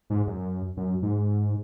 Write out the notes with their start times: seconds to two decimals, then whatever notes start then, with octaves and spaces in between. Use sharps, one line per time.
0.10 G#2
0.27 F#2
0.77 F#2
1.02 G#2